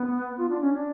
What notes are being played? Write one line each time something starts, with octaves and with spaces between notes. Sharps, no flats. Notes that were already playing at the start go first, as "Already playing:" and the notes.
Already playing: B3
F4
D4
C#4
D4